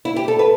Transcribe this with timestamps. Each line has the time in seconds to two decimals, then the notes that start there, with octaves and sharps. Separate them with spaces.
0.05 E4
0.16 G4
0.28 A4
0.39 B4